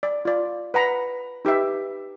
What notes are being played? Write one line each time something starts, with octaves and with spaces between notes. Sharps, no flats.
D5
F4 D5
B4 F#5 A#5 B5
D#4 G4 B4 E5